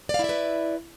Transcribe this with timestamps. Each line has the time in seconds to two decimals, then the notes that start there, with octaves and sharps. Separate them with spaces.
0.09 D5
0.14 F5
0.19 E4
0.24 E5
0.29 B4